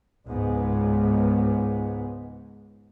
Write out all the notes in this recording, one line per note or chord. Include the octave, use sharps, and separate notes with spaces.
C#2 G#2 B3